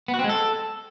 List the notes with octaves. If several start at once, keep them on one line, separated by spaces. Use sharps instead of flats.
B3
F#4
C4
G#3
A4